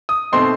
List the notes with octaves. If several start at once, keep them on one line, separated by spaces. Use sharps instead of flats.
D#6
B2 A3 C4 D#4 C6